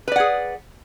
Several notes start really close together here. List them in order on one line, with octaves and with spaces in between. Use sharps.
B4 D5 F#5 G#4